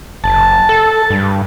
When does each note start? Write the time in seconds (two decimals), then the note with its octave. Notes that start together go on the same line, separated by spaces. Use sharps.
0.24 F#1 A5
0.69 A4
1.10 G2